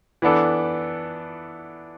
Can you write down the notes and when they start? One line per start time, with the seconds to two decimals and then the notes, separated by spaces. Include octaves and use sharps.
0.22 E3 B3 D4 A4